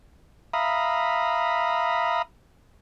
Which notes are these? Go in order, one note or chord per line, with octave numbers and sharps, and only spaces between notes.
E5 F5 A#5 B5 D#6